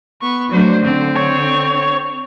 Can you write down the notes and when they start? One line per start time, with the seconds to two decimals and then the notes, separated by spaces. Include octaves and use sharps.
0.21 B3 C#6
0.52 F#3 A3 D4 C5
0.84 D3 C4
1.16 C#5